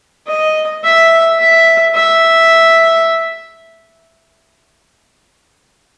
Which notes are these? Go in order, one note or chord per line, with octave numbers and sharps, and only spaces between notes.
D#5
E5
E5
E5